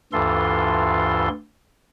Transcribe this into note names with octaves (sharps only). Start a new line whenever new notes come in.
D2 G2 E3 F4 A4 C6